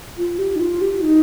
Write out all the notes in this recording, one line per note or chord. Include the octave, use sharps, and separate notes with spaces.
F4
G4
D#4
F4
G4
D#4